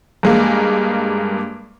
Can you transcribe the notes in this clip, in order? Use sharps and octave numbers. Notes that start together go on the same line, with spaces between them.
G2 G#3 A#3